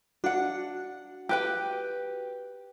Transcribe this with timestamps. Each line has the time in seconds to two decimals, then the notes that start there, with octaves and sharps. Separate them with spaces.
0.24 D4 F#4 F#5
1.29 G4 B4 G5